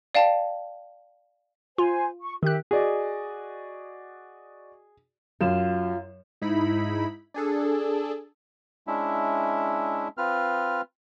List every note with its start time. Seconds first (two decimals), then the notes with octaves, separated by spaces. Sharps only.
0.15 D5 F5 G5 A5
1.78 F4 C5 G#5
2.21 C#6
2.43 D#3 G4 E5 F#6
2.71 F#4 G#4 D5 D#5
5.41 F#2 F4 E7
6.41 G#2 D#4 E4 B5
7.34 D4 G#4 A4
8.87 G#3 C#4 D4 E4 E5
10.17 C4 F4 B4 F6